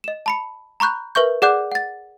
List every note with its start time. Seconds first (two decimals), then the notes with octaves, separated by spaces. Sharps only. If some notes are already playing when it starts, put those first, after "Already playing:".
0.04 D#5 E7
0.26 A5 B5 C#7
0.80 A#5 B5 C#6 F#6 G6
1.15 A#4 B4 E5 C#6 G6
1.42 G#4 D5 F#5 D6 F#6 G6
1.72 F#5 A6